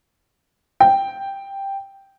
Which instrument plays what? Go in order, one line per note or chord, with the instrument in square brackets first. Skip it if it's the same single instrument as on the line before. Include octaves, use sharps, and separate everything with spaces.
[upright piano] G5